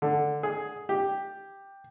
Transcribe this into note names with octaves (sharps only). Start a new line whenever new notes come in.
D3
G#4
G4